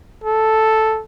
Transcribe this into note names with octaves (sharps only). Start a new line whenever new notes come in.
A4